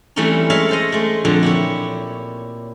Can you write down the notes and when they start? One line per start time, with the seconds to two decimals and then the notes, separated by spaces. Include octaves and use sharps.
0.16 E3 G3 A3 C4 C#4 D#4
0.50 G#3 C#5 E5 F5
0.69 A4 C5 D#5
0.92 G#3 A3
1.25 F2 A#2 D3 F3
1.43 E4 G4 C#5